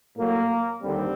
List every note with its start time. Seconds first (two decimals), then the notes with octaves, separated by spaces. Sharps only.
0.17 A2 F#3 A#3
0.82 D#2 D3 G3 C4